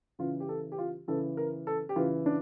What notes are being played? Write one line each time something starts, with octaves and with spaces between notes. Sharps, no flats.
C#3 E3 F4
G4
A4
G4
F4
C#3 E3 A4
A#4
A4
G4
C#3 E3 F4
D4